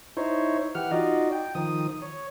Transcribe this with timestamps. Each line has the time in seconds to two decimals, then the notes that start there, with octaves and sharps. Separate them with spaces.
0.17 D#4 E4 C5 C#5
0.75 E3 G4 F#5 F6
0.91 D#4 F4 F#4 D5 D#5
1.32 G5
1.55 D#3 F3 D#6
2.02 C#5